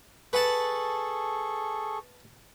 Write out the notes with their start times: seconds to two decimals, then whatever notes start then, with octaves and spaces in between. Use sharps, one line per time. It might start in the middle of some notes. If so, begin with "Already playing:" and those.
0.33 G#4 A4 B4 F#5 A5 C#6